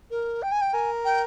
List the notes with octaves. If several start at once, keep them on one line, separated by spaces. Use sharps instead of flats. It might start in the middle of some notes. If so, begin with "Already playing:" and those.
A#4
G5
G#5
G5
A#4 G#5
G5